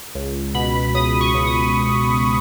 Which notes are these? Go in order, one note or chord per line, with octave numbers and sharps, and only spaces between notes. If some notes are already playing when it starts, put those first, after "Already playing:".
C#2
B2 B5
C#2 D#6
C#6
C#2
D#6